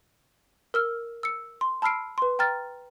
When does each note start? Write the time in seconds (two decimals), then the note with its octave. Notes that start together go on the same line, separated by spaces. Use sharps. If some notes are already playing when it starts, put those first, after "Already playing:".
0.74 A#4 E6 F6
1.23 E6 C#7
1.61 C6
1.82 A5 B5 E6 F6 C7 D7
2.18 B4 C6
2.39 G5 A#5 F6 A6